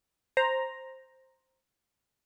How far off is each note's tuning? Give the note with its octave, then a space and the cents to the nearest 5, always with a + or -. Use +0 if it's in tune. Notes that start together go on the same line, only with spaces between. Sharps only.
C5 +5 A#5 +0